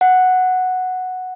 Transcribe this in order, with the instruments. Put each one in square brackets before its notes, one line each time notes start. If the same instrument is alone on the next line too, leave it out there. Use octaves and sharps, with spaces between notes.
[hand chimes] F#5